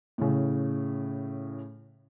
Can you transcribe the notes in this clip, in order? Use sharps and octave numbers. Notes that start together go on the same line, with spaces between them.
A2 C#3